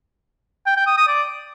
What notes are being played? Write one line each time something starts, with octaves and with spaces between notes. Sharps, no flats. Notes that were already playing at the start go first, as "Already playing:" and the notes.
G5
G5
D#6
D#6
D5